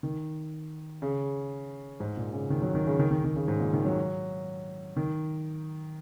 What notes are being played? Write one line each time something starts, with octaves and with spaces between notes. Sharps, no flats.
D#3
C#3
G#2
A#2
C#3
D#3
F#3
D#3
C#3
D#3
D#3
D#3
C#3
G#2
A#2
D#3
F#3
D#3